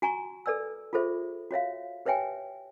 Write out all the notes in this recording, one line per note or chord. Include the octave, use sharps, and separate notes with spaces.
F#4 G#5 A#5 C#6
A4 B4 D5 G#5 E6
F4 G#4 A4 C5 E5
F#4 C#5 E5 F5
G4 B4 C#5 E5 G5 G#5